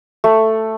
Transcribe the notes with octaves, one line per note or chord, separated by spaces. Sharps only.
A3